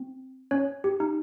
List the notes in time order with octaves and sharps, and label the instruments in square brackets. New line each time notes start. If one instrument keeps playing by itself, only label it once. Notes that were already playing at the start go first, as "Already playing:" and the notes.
Already playing: [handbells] C4
C#4 C#5
G4
D#4